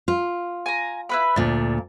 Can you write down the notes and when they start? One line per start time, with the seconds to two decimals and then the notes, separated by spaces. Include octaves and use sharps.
0.08 F4
0.66 G#5 A#5
1.09 E4 B4 B5
1.36 D2 A#2 D4